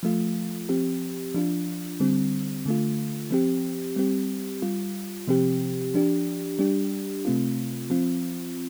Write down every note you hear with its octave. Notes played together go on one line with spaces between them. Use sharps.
F3 A3 F4
F3 C4 G4
F3 D4 F4
D3 G3 C4
D3 A3 F4
F3 C4 G4
G3 C4 G4
G3 F4
C3 F3 C4 G4
F3 D4 G4
G3 D4 G4
C3 A3 C4 F4
F3 C4 F4